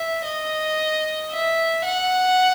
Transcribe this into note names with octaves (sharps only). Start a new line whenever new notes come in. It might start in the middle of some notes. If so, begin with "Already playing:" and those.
Already playing: E5
D#5
E5
F#5